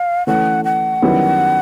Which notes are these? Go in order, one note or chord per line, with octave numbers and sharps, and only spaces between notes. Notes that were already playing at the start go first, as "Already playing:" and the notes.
Already playing: F5
E3 A3 C#4 F#5
F#5
F#2 D#3 G3 B3 E4